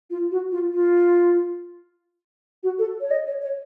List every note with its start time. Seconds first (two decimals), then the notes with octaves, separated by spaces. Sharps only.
0.10 F4
0.31 F#4
0.51 F4
0.73 F4
2.63 F#4
2.79 A4
3.01 C#5
3.11 D#5
3.27 C#5
3.42 C#5